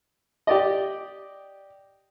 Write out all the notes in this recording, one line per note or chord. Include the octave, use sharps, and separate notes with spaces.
G4 D5 D#5